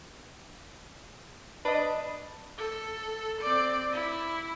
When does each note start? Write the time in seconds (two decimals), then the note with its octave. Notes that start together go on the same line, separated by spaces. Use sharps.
1.65 D4 B4 D#5
2.58 A4
3.41 C4 D5
3.92 E4